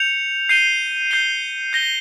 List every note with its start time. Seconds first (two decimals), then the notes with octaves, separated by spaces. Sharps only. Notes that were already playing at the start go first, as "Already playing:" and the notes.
Already playing: G6 C#7 F7
0.49 G6 C7 D#7 G7
1.11 G6 C7 D#7 G7
1.73 G6 A#6 D#7 G7